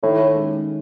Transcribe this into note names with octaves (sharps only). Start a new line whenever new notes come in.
A2 D#3
G#3 C#4